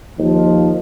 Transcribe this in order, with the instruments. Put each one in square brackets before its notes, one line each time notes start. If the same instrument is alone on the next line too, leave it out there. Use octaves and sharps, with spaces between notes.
[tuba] D#2 [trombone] F3